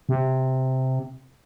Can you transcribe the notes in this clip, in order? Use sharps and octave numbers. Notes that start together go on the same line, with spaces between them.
C3